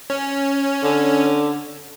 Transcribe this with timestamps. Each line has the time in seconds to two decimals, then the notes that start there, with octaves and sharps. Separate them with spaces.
0.10 C#4
0.83 D3